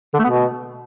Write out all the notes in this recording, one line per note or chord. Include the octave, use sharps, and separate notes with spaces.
D3
A3
B3
B2